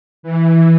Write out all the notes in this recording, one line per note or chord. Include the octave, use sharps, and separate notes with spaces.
E3